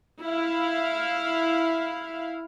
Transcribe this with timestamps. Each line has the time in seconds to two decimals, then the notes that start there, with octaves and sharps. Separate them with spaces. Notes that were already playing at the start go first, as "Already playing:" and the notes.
0.22 E4 F5